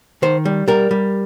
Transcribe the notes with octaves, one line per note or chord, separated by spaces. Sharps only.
D#3 C5
G3
G3 A#4
G3